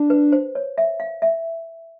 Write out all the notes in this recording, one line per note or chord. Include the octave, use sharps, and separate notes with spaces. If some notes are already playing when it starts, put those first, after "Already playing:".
Already playing: D4
B4
C5
C#5
E5
F5
E5